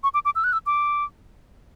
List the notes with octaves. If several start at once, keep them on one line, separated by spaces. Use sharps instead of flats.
C#6
D6
D6
E6
F#6
E6
D6